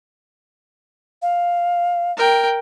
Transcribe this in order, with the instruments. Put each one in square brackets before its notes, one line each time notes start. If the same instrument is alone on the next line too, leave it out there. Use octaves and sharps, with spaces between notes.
[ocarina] F5
[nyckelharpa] A#4 G5